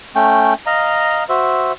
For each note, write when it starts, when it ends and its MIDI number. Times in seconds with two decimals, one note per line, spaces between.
0.16 0.54 57
0.16 0.54 61
0.16 0.54 79
0.66 1.24 75
0.66 1.24 77
0.66 1.24 82
1.29 1.72 66
1.29 1.72 72
1.29 1.72 76